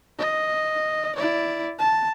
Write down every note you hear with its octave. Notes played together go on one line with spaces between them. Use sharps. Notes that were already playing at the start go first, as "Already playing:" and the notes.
D#5
E4 D5
A5